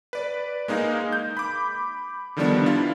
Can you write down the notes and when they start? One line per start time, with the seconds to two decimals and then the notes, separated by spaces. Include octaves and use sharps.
0.13 B4 D5
0.68 G#3 A#3 D#4 G#4 F5
1.13 G6
1.37 B5 D6
2.37 D3 D#3 F3 G3 B3 D4
2.66 E4 F4 F5